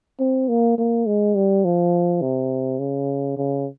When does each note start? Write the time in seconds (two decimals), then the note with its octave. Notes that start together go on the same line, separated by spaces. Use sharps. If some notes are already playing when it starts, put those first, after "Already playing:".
0.20 C4
0.49 A#3
0.78 A#3
1.06 G#3
1.35 G3
1.65 F3
2.22 C3
2.79 C#3
3.37 C#3